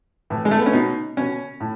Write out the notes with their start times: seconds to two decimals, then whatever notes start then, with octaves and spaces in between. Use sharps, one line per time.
0.30 A2 E3
0.45 G#3
0.51 A3
0.58 B3
0.66 C#4
0.73 B2 D#4
1.17 B2 C#4
1.60 A2